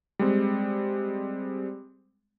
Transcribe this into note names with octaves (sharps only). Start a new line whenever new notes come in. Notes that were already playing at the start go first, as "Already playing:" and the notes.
G3 G#3 C4